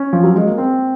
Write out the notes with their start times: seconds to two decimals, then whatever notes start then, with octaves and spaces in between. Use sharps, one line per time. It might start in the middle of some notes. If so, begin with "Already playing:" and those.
Already playing: C#4
0.13 F3
0.24 F#3
0.36 G#3
0.47 A#3
0.58 C4